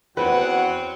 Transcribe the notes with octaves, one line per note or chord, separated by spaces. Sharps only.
E2 C4 C#4 F#4 B4 F#5